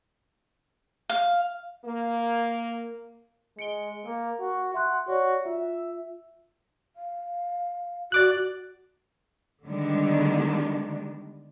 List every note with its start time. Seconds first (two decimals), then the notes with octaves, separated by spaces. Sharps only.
1.09 F5
1.85 A#3
3.59 G#3 C#7 D7 G7
4.05 A#3 A#4
4.40 F#4
4.74 E5 F#5 C6 F#6
5.08 F#4 C#5 D5
5.45 F4 E5
6.96 F5
8.12 F#4 D5 D6 F#6
9.65 D3 D#3 G3 G#3 B3 D4